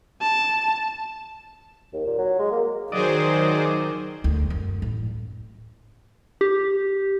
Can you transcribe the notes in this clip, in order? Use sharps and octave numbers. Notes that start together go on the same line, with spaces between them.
A5
D#2
A#2
F#3
G#3
A#3
D#3 F#3 G#4 C5 D5 D#5
D2
F#2
A1
G4